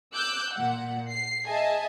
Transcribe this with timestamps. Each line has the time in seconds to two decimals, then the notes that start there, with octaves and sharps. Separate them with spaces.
0.15 D6 E6 F#6 G6
0.53 A#2 F#5
1.10 C7
1.46 G#4 D#5 E5 G#5 A5